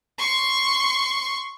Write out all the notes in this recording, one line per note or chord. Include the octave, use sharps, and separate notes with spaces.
C6 C#6